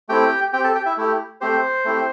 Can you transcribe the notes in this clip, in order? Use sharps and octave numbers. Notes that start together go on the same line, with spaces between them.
A3 C4 E4 G4 G5
C4 G4 G5
A4 A5
G4 G5
E4 E5
A3 E4 G4
A3 C4 G4 C5
A3 C4 E4 G4